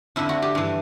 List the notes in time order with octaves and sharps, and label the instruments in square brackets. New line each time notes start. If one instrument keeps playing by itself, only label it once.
[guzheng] F2 D3 E4
F#4
G4
G2 E3